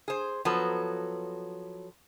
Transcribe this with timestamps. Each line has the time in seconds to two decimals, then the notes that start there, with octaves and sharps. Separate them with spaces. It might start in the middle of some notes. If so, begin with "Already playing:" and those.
0.08 G#4 C5
0.45 F3 F#3 B3 A4 B4